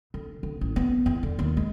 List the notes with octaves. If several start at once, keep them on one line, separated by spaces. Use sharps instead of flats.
D3
D3
A1
B3
E2
D3
D#2
G#3